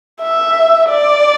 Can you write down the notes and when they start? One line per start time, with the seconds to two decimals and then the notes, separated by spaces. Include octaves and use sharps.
0.21 E5
0.89 D5